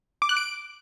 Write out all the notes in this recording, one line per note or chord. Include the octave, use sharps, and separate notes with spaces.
D6
F#6
D7